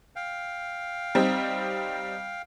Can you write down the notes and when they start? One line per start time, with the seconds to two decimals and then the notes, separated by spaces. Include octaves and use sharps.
0.16 F5 G5
1.15 G3 C4 D#4